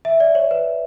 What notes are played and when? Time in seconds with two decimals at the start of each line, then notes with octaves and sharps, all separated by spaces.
0.05 E5
0.20 D5
0.35 C#5
0.51 B4